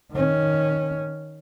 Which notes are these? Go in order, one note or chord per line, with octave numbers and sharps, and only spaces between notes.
D#3 C#4